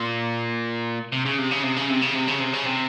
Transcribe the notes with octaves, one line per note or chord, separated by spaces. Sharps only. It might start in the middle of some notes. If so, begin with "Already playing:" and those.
Already playing: A#2
C3
C#3
C3
C#3
C3
C#3
C3
C#3
C3
C#3
C3
C#3
C3